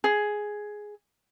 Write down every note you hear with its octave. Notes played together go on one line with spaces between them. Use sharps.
G#4